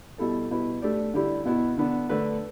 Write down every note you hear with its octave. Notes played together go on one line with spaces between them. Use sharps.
B2 G3 E4 A4
B2 G3 E4 B4
A3 D4 G4 D5
D3 G3 E4 G4 D5
B2 B3 E4
D3 B3 D4
D3 A3 D4 B4